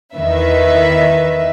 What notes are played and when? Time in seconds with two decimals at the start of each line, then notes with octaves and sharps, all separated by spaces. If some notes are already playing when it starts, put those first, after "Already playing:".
0.15 E2 D#3 B4 E5